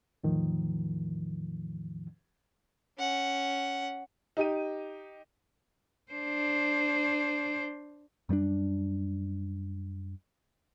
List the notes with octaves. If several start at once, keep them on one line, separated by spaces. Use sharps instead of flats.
E2 A2 D#3 F3
C#4 F#5
D#4 G4 D#7
D4 C5
F#2 G3 A3 D4